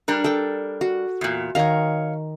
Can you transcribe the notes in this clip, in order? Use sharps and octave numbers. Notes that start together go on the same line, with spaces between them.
G3 D4 A#4
A4 G5
F#4
E2 A#2
D#3 C#5 F5 A#5